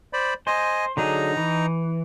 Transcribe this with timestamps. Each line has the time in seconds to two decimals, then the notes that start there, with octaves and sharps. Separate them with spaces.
0.13 C5 D5 B5
0.47 C5 D#5 G#5
0.97 D3 F#3 D#4 G#4 A#5
1.37 E3